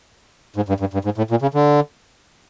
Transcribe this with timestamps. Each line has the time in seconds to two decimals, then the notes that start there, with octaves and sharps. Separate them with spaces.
0.56 G#2
0.69 G2
0.80 G2
0.94 G2
1.05 G#2
1.18 A2
1.31 A#2
1.42 C#3
1.54 D3